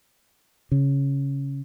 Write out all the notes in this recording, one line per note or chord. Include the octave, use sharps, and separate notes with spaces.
C#3